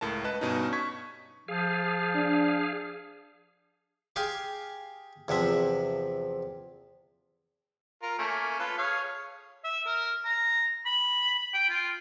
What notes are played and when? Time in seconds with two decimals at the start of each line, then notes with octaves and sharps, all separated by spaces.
0.01 C#2 A2 A#4 A5
0.24 B4 D#5 A5 F#6
0.41 G2 B2 C#4 D#4
0.73 C#6 G#6 B6
1.48 F3 G#4 F5
2.15 D4
4.16 G4 G#4 F5 G#5 C6
5.28 E2 C3 F3 E5
8.02 F4 A#4
8.19 A3 A#3 C#4
8.59 F4 A4 B4
8.78 G#4 C#5 F5
9.64 E5
9.86 A#4
10.25 A#5
10.85 B5
11.54 G5
11.69 F4